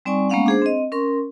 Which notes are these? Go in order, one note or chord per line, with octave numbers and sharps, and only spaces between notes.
G3 C4 D#4 D5 G#5 C#6
G#3 A#3 B3 C#4 F5 F#5
D4 G#4 C5
C4 D#5
C#4 A#4 C6 C#6